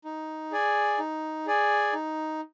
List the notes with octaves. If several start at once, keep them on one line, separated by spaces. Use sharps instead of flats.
D#4
G#4 D5 G#5
D#4
G#4 D5 G#5
D#4